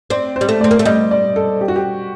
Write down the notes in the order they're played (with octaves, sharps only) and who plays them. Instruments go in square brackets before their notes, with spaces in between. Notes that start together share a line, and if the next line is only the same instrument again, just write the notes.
[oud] C4 [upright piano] D5
[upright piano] C5
[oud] G3
A3
[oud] C4 [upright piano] D5
[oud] A#3
A3
[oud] G3 [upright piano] D#5
[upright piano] D5
A4
G4
F#4
G4